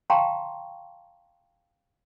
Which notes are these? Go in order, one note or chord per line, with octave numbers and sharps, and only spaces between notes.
F5 G5 A5 A#5 C6 C#6